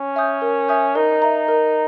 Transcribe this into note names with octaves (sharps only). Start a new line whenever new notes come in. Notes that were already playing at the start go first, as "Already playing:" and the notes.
Already playing: C#4
E5 G#5 D#6 G6
A#4
E5 G#5 D#6 G6
D#4 A#4
E5 A#5
A#4